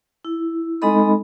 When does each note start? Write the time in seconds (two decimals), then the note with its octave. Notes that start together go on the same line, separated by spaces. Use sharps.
0.25 E4
0.82 G#3 C4 D#4 A4 D#5 B5